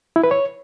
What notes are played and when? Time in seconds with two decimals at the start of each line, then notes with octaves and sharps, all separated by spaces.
0.16 E4
0.24 B4
0.31 C#5